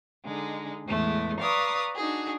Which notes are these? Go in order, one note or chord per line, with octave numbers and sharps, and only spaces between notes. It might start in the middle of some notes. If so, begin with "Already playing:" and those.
D3 G#3 D#4
E2 A2 E3 G#3 A3
B4 D5 F5 A#5 C#6 D#6
D4 D#4 F#4 G#4